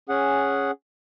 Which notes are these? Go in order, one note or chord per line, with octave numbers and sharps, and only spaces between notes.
C#4 G#4 F#5